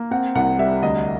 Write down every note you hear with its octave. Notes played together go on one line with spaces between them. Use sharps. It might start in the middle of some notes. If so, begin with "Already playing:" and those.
Already playing: A#3
C4 F#5
C2 F#5
G3 E5
D2 D#5